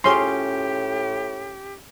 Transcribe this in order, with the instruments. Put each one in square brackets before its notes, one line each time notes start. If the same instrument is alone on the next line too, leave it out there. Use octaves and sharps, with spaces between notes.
[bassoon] A2 [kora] C#4 F4 G#4 [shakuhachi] G4 [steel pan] C6